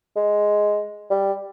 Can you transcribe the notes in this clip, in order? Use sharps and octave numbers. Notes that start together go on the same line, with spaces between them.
G#3
G3